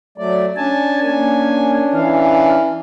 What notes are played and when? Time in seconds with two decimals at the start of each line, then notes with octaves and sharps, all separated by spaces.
0.18 F#3 A3 D5
0.57 C#4 D4 G#5 A5
1.03 A#3 G#5
1.95 E3 F5